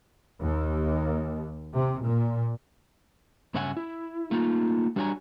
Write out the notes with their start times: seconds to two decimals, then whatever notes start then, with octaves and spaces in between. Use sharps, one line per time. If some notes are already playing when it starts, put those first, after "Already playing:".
0.42 D#2
1.74 C3
2.05 A#2
3.54 G2 C#3 C#5 E5 F#5 G#5
3.77 E4
4.31 A3 A#3 D#4 F4
4.96 G3 D4 F#4 C#5 G#5 A#5